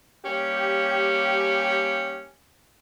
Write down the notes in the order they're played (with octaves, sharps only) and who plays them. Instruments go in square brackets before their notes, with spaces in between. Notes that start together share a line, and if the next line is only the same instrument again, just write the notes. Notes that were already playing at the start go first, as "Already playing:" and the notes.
[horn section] G3 A#3 C#4 G4